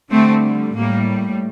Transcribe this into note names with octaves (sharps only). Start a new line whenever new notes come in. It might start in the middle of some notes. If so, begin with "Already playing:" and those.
D3 G3 A3 C4
A2 G3 A#3